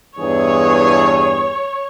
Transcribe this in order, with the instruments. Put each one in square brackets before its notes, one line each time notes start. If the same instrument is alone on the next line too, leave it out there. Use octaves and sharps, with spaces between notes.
[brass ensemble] E2 G2 G#4 [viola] C#5